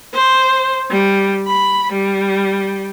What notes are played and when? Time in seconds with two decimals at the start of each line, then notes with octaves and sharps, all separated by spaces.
0.14 C5
0.90 G3
1.47 B5
1.92 G3